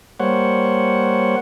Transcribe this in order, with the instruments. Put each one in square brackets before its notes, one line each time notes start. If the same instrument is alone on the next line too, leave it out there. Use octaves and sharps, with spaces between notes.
[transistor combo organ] G3 A#3 C5 C#5 F#5